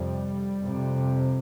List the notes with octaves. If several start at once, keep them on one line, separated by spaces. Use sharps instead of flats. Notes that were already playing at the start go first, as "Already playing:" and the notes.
Already playing: F2 C3 G3
F2 C3